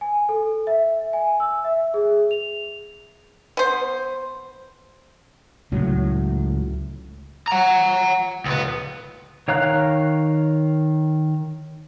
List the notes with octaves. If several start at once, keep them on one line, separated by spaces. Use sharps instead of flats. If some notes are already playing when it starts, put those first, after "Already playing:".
G#5
A4
E5
G#5
E6
E5
G#4
F7
B3 C5
C#2 A2 F#3
F#5 A#5
C#2 B3
D#3 C#5 F5 A#5 F#6